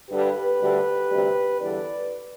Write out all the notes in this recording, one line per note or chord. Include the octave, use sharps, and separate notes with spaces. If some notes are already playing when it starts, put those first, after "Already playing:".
G2 D3 G3 G4 B4
D2 D3 G3
D2 C3 G3
E2 D3 G3 B4 D5